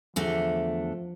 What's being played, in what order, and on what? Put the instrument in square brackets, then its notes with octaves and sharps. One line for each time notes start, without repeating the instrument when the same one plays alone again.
[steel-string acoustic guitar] E2 D3 A3 [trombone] F3